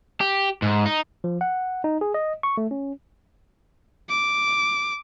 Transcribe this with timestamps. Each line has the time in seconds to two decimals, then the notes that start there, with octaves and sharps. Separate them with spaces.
0.21 G4
0.62 G#2
0.86 D#4
1.24 F3
1.41 F#5
1.84 D#4
2.01 G#4
2.14 D#5
2.43 C#6
2.57 A3
2.71 C#4
4.10 D6